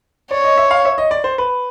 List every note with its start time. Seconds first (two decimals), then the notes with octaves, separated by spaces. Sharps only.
0.31 C#5 D5
0.44 D#5
0.57 E5
0.71 F5
0.85 E5
0.98 D#5
1.11 D5
1.24 C5
1.38 B4